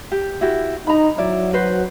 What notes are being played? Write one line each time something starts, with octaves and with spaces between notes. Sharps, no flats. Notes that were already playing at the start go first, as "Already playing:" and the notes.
G4
E4 F#4 G4
D#4 A#5 B5
F#3 E4 D5
F#4 B4 C5